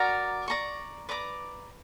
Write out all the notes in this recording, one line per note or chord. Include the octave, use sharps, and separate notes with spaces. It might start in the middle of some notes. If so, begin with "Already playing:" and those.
Already playing: F#4 A#4 D5 A#5
D5 A#5 C#6
B4 D5 A#5 D6